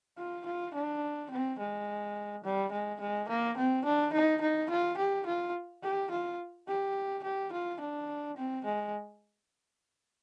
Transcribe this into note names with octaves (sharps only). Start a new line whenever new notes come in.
F4
F4
D4
C4
G#3
G3
G#3
G#3
A#3
C4
D4
D#4
D#4
F4
G4
F4
G4
F4
G4
G4
F4
D4
C4
G#3